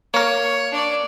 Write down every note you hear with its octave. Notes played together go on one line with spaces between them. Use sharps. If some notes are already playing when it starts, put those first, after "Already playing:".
A#3 A#4 C#5 C#6
D4 D5